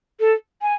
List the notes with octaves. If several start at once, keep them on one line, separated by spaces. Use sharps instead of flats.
A4
G#5